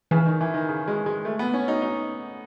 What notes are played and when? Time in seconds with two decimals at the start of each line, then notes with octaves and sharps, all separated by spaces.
0.11 C#3 E3
0.26 D#3
0.41 E3
0.54 D#3
0.69 C#3
0.88 G#3
1.06 G#3
1.25 A3
1.39 B3
1.54 C#4
1.68 D#4
1.82 D#4